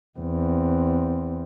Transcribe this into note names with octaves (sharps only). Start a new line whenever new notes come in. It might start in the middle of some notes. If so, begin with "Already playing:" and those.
E2 C4